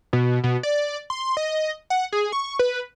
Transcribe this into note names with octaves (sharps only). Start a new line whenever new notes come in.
B2
B2
D5
C6
D#5
F#5
G#4
C#6
B4